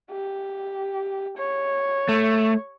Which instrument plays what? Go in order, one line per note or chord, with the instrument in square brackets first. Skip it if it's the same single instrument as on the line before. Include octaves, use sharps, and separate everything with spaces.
[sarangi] G4
C#5
[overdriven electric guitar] A3